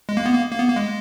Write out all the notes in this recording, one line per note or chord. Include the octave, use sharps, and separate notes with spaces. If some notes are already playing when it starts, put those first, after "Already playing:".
G#3
A#3
B3
A#3
A#3
B3
A#3
G#3